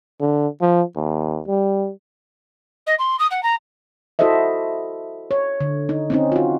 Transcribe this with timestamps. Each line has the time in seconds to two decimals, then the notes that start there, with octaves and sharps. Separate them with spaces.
0.20 D3
0.61 F3
0.96 D#2
1.47 G3
2.86 D#5
2.98 C6
3.19 D#6
3.30 F#5
3.43 A#5
4.19 E4 F#4 A4 C5 D#5 E5
5.31 C#5
5.61 D3
5.89 D#4
6.10 C4 C#4 D#4
6.32 F4 F#4